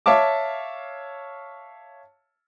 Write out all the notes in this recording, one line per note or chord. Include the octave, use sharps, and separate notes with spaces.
C#5 E5 F5 A5 D6